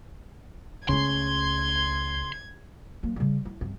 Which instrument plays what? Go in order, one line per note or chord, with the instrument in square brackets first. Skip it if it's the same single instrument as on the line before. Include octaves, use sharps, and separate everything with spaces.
[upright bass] C#2 A3 [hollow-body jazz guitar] C#3 [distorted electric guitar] C6 [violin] G#6
[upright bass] F#3 A#3
C#3 G3
E4
G1 C4